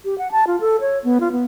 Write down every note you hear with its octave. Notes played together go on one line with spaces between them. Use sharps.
G4
F#5
A5
F4
A4
C#5
B3
F4
B3